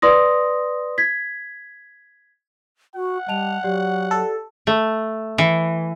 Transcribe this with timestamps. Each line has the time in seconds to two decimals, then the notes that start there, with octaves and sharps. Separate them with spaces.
0.02 B4 D5 C6 D#6 A#6
0.98 G#6 B6
2.95 F#4 F#5
3.28 G3 D#5 A5 F7
3.63 F#3 G4 D5
4.11 A4
4.67 A3
5.38 E3